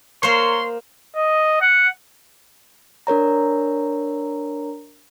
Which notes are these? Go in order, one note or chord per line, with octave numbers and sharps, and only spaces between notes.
A#3 A#4 C5 C#5 C6
D#5
F#5
D4 A#4 C#5 A#5